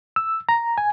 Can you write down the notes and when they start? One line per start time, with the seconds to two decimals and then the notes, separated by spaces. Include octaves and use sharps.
0.16 E6
0.49 A#5
0.78 G#5